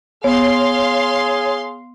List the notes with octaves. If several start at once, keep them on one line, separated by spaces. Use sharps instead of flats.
B3 G#4 C#5 F5 C6